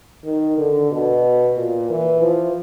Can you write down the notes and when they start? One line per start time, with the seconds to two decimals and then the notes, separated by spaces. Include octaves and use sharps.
0.24 D#3
0.57 D3
0.91 B2
1.57 A#2
1.90 E3
2.22 F3